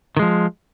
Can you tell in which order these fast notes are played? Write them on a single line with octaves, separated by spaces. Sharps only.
D#3 G#3 F3